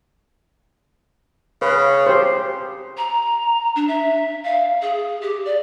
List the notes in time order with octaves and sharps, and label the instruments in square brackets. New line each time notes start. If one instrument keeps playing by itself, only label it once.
[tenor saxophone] C#3 [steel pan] B4
[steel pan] G4 C5
[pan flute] A#5
D4
E5
F5
G#4
G4
D5